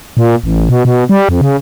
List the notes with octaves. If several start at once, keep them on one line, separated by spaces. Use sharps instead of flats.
A#2
A1
B2
B2
G3
F2
C#3